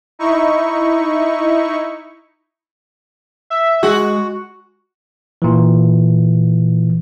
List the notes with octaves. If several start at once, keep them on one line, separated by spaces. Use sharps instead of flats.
D#4 E4 C#6
E5
G#3 F#4
A#2 E3